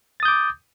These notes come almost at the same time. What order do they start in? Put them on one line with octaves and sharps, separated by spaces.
A6 D#6 G6 D6